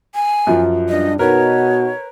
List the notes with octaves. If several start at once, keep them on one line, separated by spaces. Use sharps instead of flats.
G#5
F#2 F3
G2 D4 D#5
B2 D#4 F#4 A#4 B4 C#5